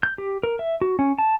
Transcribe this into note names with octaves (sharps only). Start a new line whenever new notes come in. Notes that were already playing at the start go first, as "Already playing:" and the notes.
G6
G4
A#4
E5
F#4
C#4
A5